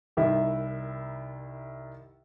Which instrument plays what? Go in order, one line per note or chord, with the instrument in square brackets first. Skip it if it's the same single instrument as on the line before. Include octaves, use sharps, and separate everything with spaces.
[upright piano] C2 D#3 E4 E5